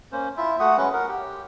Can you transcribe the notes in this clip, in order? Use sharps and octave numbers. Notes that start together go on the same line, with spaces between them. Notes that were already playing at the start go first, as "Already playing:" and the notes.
A#3 C#4 C5
E4 F4 E5
A3 F#4 F#5 D#6
F#3 G#3 C#4 B4
A#4 F#5
G4